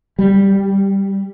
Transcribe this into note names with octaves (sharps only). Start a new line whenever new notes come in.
G3